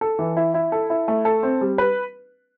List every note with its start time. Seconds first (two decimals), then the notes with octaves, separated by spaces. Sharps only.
0.01 A4
0.19 E3
0.37 E4
0.54 E4
0.72 A4
0.90 E4
1.08 A3
1.25 A4
1.43 C4
1.61 G3
1.78 B4